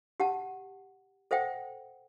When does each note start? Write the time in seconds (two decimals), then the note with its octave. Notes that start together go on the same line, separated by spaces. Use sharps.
0.20 G4 F#5 A5
1.31 A4 C5 E5 F#5 G5